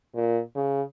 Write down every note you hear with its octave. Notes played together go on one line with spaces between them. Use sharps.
A#2
C#3